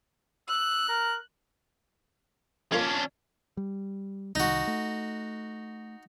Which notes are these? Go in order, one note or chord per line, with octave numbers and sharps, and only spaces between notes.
E6 F#6
A#4
F2 A#3 C#4 D4 C6
G3
C2 D#3 D#4 F#4
A3